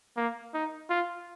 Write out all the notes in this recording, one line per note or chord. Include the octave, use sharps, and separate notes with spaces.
A#3
D#4
F4